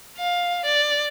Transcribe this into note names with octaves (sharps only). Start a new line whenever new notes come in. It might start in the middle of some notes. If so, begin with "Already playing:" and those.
F5
D5